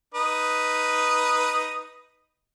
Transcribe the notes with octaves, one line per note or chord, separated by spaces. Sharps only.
D#4 B4 D#6